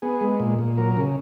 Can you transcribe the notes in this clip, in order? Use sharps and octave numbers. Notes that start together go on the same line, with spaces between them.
B3 G#4
G#3
A#2
A#2
F#3 A#4
C#3